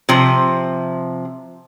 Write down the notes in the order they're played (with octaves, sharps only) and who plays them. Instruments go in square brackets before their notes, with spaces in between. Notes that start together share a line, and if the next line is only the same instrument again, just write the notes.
[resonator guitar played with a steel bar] C3 F3